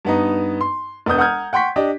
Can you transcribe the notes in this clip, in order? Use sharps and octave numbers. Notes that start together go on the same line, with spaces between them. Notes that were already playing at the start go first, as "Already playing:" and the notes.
G2 B3 D#4
C6
E1 B3 D4 D#6 G6
F#5 A#5 D#6 F6 G6 G#6
F#5 G5 C6 C#6 B6
D4 G4 D#5